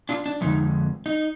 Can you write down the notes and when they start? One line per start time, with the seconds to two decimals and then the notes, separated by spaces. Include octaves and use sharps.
0.09 D4 F4
0.26 D4
0.41 F2 D3 G#3 D#4
1.06 D#4